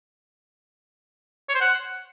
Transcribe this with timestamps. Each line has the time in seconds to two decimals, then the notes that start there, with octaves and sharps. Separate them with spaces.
1.49 C#5
1.55 C5
1.61 F#5